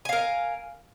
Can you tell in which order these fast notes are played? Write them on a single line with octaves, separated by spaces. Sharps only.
G#5 F5 A#4